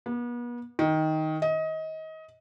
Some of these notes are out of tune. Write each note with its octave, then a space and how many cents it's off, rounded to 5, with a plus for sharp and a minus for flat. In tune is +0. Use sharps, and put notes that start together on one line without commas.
B3 -40
D#3 +10
D#5 +25